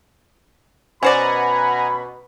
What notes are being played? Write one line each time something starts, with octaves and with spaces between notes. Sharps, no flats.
B2 C#4 C5 D5 F#5 G#5 A#5 B5